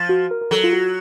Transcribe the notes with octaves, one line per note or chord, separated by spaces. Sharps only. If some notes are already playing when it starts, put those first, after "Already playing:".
Already playing: F3
F#4
A#4
A#4
F#3 A4
F4
F#4